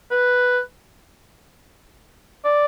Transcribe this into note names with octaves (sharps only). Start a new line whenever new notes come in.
B4
D5